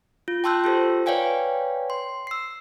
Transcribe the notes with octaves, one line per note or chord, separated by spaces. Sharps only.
F4
G5 A5 C6 E6 F#6 G6
F4 G4 A4 C5
B4 C#5 D5 F5 G5 G#5
C6
E6 C7